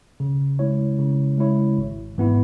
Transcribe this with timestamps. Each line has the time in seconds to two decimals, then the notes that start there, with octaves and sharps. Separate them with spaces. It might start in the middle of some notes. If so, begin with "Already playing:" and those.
0.20 C#3
0.59 G#3 E4 C#5
0.98 C#3
1.38 G#3 E4 C#5
1.78 G#1
2.18 G#2 E3 B3 E4